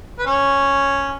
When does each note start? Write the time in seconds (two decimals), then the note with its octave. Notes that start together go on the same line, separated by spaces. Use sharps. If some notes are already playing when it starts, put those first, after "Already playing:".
0.19 B4
0.26 C#4 C#5